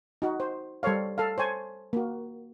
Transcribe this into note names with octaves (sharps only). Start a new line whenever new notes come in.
D#4 F#4
C5
G3 A4 C5 C#5 F5
A4 F5
C5 C#5 G#5 A5
A#3 F#4